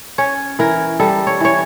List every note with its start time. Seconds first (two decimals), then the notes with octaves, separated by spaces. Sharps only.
0.18 C#4 C#5
0.59 E3 A#4
1.00 G3 A4
1.27 C#5
1.41 E3 C#5